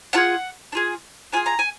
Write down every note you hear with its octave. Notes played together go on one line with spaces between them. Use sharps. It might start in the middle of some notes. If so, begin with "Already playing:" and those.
D4 F4 G#4 F#5
D4
F4 G#4
D4 F4 G#4 G#5
A#5
G#5